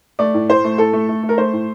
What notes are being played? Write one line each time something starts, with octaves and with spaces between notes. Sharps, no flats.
A3 D5
A2
A2 C5
A3
A2 A4
A3
A3
A3
A#4
A3 C5
A2